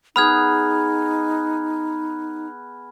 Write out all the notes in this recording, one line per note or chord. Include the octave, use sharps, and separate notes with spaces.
B3 D#4 G#4 B5 F6 G#6